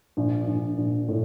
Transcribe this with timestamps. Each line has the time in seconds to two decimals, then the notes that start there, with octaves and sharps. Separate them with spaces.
0.17 A#1
0.47 A#1
0.77 A#1
1.08 A2